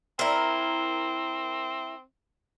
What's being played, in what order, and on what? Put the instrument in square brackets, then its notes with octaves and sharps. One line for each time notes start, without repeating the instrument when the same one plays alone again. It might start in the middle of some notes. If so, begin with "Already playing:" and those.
[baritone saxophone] C4 [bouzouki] E4 A#4